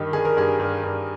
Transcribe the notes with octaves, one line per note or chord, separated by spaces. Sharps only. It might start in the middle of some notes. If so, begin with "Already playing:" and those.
Already playing: G2 D#3 G4
D#3 G#4
A#4
G2 G#4
G2
G2